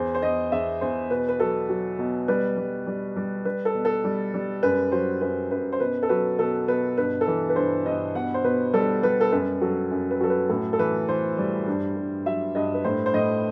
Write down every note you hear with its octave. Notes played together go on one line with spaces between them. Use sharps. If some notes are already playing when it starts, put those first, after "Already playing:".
Already playing: E2 C5
C5
E2 D#5
E2 E5
E2 C5
B2 B4
B4
F#3 A4
F#3
B2
G3 B4
G3
G3
G3
G3 B4
A4
B2
A4
G3
G3
F#2 B4
F#3 C5
F#2 B4
F#2 B4
C5
B2 B4
A4
F#3 B4
B2 A4
B2 B4
G2 B4
A4
E3 B4
B4
G2 C5
G2 D#5
B2 F#5
C5
B2 B4
G3 A4
G3 B4
A4
F#2 B4
F#3 A4
F#2
B4
F#3 A4
B4
A2 A4
A4
E3 B4
E3 C5
G3
G2
G2
F#3 E5
G2 D#5
B4
A2 C5
C5
A2 D#5